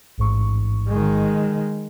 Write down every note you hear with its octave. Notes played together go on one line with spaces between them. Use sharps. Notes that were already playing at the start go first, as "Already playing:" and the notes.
A1 G#2 C#6
D#3 G#3